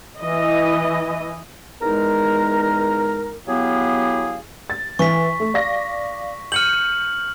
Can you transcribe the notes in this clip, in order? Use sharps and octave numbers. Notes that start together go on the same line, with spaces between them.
E3 E4 D#5
E2 G#3 D#4 A#4
F#3 B3 E4 G4 G#4 F5
A6
E3 C#6 B6
A3
D5 F5 A#6
F6 G6 C#7 D#7 F#7